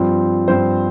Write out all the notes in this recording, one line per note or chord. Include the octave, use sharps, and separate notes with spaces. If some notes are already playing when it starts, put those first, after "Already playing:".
Already playing: G2 F3 C4
G2 F3 C4 C5